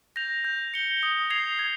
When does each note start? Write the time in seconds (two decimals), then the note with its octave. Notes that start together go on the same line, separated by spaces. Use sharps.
0.16 G6 A#6 F7
0.45 G6
0.74 C#7 G7
1.03 D#6
1.30 G#6 C7 F7
1.59 G#6